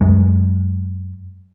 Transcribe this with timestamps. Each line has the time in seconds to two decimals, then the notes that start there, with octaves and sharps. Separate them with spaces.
0.01 F#2 G#3